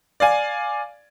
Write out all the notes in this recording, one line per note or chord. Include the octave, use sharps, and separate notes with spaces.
D5 F5 G#5